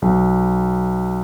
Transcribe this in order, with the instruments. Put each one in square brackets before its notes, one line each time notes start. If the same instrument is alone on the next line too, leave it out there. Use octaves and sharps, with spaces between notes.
[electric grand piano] B1